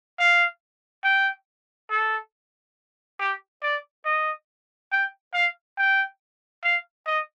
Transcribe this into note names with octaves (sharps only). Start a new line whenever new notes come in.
F5
G5
A4
G4
D5
D#5
G5
F5
G5
F5
D#5